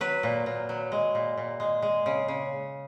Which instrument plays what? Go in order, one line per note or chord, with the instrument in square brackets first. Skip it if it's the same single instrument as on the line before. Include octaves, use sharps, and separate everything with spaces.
[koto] F#3 B4
A#2
A#2
F#3
G#3
A#2
A#2
G#3
G#3
C#3
C#3